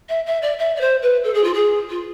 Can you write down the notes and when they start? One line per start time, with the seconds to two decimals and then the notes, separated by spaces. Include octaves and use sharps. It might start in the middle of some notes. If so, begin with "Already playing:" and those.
0.09 E5
0.26 E5
0.42 D5
0.59 E5
0.76 D5
0.80 C5
1.02 B4
1.23 A4
1.33 G#4
1.44 F4
1.53 G#4
1.89 F4